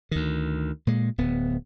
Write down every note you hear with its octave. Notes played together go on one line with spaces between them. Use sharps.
D2 D#3
A#2 G#3
D1 B3